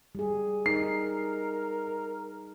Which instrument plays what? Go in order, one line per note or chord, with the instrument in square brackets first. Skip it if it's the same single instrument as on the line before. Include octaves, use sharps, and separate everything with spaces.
[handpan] G3 G#4
[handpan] D#4 [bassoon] A#4 [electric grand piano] C7